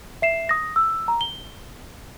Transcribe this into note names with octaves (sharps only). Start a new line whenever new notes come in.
E5 C7 E7
D#6 A#6
E6
A#5
G7